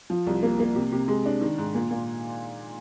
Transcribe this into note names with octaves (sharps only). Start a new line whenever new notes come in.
F3
C2
A#3
A#3
C3
C3
G#3
D4
D#3
G#2
A#2
A#2